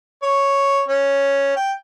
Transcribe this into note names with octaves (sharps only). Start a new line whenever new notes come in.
C#5
C#4
G5